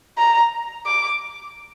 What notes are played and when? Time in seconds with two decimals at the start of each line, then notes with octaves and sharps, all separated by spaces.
0.18 A#5
0.86 D6